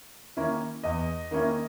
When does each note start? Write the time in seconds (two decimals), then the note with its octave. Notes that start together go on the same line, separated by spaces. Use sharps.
0.37 D#3 A#3 C#4 E4
0.84 E2 D#5
1.31 D#3 A#3 C#4 E4